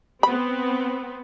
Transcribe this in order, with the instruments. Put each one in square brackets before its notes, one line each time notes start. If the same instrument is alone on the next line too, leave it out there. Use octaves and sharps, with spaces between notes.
[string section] B3 C4 [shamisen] B5